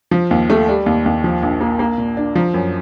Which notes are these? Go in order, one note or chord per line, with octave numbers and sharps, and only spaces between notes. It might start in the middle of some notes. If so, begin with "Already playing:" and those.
F3
D#2
A3
G3
D#2
D#2
F3
A#1
A#3
A#3
A#2
D4
F3
F#2